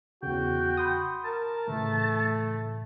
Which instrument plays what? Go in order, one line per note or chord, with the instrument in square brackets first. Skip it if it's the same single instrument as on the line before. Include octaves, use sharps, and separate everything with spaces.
[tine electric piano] E2 C#3 [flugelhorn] F#4 [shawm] G5
[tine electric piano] B5 C6 D#6
[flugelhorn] A#4 [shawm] A5
[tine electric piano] A2 C#3 E3 [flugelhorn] A3